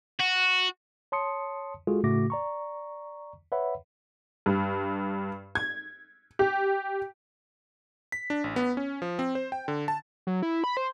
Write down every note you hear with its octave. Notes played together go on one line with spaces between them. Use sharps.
F#4
C#5 A5 C6 D#6 C#7
G#3 F4 F#4 G#4 A4
A2 C#3 A3 F#4 D6 A#6
D5 A#5 C#6
B4 C#5 E5 F#5 B5
G2
G#6
G4
B6
D4
A1
B3
C#4
F3
C4
C5
G5
D3
A5
F#3
E4
B5
C5